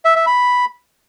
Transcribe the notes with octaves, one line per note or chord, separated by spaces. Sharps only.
E5
E5
B5